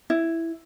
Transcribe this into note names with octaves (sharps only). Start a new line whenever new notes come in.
E4